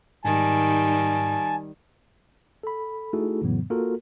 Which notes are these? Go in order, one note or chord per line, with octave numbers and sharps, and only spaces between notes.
G#2 D#3 G3 G#5 A5
A4 B5
A3 D#4 E4 F#4 G#4 A4
F2 A2 C#3 E3 F#3 B3
A#3 F4 F#4 A4 A#4